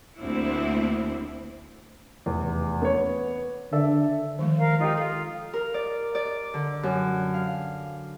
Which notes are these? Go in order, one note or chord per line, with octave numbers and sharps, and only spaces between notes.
D2 A#3 C4 D4 E4
F1 E2
B3 C#5
D3 A4 D5 E5
D#3 F3 G#3
A#4 F5
D#4 F4 G4
F4 A4
A#4
D5
D5
D3
F#2
F5